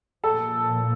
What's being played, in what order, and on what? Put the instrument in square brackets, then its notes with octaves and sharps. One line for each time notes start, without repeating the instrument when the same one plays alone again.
[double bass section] A#2 F3 A#3 [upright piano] A4